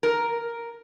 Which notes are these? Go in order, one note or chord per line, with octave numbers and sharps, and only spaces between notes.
A#4